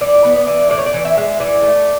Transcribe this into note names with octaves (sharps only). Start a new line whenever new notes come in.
E3 D5
B3
D5
E3
A2 D5
C#5
D5
E3
E5
G#3
E3 D5
A3